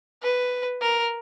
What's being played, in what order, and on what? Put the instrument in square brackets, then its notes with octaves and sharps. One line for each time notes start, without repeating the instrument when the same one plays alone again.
[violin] B4
A#4